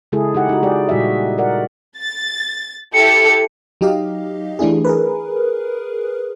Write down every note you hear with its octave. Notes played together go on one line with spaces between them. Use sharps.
C#3 G#3 E4 G#4 A4
D#4 G4 F#5
D#4 F#4
G#3 G4 G#4 D5
A#2 G3 F#4 D#5 E5
A#4 D5 F#5
A6
E4 G4 A4 C#7
F#3 D#4 G4 D#5 F5
E3 A3 D4 E4 G#4
G#4 A#4 B4